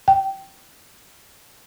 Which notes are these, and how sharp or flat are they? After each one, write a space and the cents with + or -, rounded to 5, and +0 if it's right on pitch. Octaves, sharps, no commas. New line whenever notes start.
G5 -10